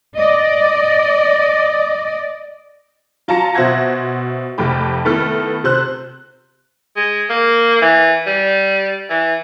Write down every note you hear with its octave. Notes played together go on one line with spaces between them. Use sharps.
D5 D#5
F#3 F4 A5 A#5 A#6 C#7
B2 C5 E5 F#5 G#6 A#6
F1 F2 A3 G4 B5
D#3 A3 B3 E4 A4 F6
C3 C5 F#6
G#3
A#3
E3
G3
E3